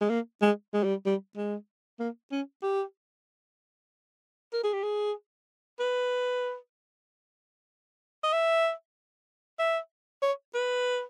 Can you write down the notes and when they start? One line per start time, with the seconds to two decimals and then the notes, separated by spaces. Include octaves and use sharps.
0.01 G#3
0.10 A#3
0.42 G#3
0.74 G#3
0.83 G3
1.06 G3
1.36 G#3
1.99 A#3
2.32 C#4
2.63 G4
4.53 A#4
4.64 G#4
4.73 G4
4.83 G#4
5.80 B4
8.23 D#5
8.33 E5
9.59 E5
10.22 C#5
10.54 B4